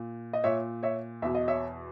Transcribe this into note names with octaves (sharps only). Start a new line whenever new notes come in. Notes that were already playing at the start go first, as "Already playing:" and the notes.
Already playing: A#2
D#5
A#2 C#5 E5
C#5 E5
E2 B2 E5
D#5
C#5 E5